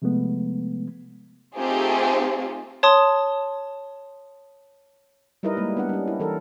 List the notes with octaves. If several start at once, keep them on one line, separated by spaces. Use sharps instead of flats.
C3 F3 G#3 A3 B3
A3 C4 D#4 F4 G4 G#4
C#5 A5 C6 D#6
G3 D#4 E4 A#4 B4 D#5
G3 G#3 A#3
B3 D4 F#5
G3 C#4
E4
E3 A4 A#4